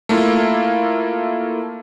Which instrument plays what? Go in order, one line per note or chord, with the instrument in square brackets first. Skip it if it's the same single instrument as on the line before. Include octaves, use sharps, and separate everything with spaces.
[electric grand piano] A3 A#3 E4 F4